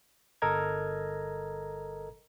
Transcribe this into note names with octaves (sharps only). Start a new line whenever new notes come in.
G1 A4 A#4 D#5 A#5 G#6